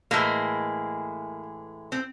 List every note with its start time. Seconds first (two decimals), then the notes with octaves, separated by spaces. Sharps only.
0.11 A2 E3 G#3 A#3
1.92 C4